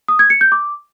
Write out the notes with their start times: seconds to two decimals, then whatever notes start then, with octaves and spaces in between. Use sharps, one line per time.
0.08 D#6
0.19 G#6
0.30 C#7
0.41 G6
0.52 D6